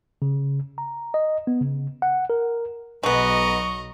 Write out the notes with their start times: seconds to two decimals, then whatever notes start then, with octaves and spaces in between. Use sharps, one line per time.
0.22 C#3
0.78 A#5
1.14 D#5
1.47 B3
1.61 C#3
2.02 F#5
2.30 A#4
3.03 B1 F#3 G#3 B3 D#5 A#5 C#6